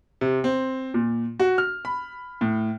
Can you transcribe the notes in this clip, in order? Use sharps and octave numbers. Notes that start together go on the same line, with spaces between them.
C3
C4
A#2
F#4
F6
B5
A2